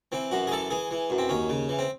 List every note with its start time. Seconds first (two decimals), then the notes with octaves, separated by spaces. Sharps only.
0.12 E3 C4
0.31 F#2 F#4
0.47 G#4
0.51 E3 A4
0.70 E3 G#4
0.91 E3
1.10 F#2
1.18 C4
1.29 D#2 C#4
1.49 C#3
1.69 E3
1.79 C4